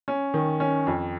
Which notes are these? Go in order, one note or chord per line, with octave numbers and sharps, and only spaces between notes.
C#4
D#3
C#4
F2